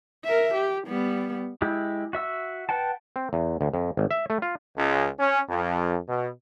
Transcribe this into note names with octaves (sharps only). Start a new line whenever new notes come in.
A#4 E5
G4
G3 B3
G#3 E4 G4
F#4 E5 E6
B4 F#5 G5 A5
C4
E2
D2
F2
G#1
E5
A3
F4
C#2
C#4
F2
B2